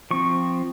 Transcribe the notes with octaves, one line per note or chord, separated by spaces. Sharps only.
F3 C4 C#6